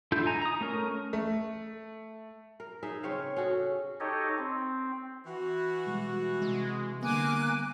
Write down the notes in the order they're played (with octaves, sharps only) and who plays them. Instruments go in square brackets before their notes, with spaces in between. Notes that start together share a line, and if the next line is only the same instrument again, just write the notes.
[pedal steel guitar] D4 E4 F4 A4 G6
D#4 G#5 A#5
A#5 D#6
A3 C#4 A#4
[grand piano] A3
[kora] A#4
D#4 G#4 E5
C#3 C4 C#5 F5
C#4 F#4 G#4 A4
[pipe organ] D#4 G4 A4 C#5 D#5
C4
[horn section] E3 F#4
[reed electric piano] B2 G3 G#3
[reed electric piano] C3 [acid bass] G#3
[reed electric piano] D3 G3 B3 [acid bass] A#3 [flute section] G#5 D6 F#6